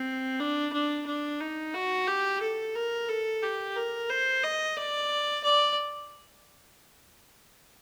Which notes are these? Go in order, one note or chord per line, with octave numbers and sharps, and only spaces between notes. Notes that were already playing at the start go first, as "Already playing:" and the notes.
Already playing: C4
D4
D4
D4
D#4
F#4
G4
A4
A#4
A4
G4
A#4
C5
D#5
D5
D5